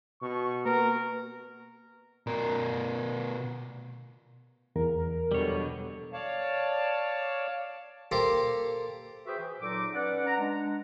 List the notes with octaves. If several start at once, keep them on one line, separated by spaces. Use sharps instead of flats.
B2 C#6
A#3 B3 A#4
B2 A#4
E2 A#4
B2 D3 F#3 G3 C#5
C#5 D5 F5 A5
A#3 G4 A4 A#4 C5
F#4 G#4 B4 C5 E5 G5
E3
A#2 F#3 D#4 A4 D6
C#4 B4 D5 F#5
A#5
G#3 D4